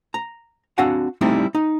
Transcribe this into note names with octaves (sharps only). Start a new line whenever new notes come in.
A#5
C4 D4 F#4 F5 F#5 G#5
G3 A3 C4 D#4 E4
D#4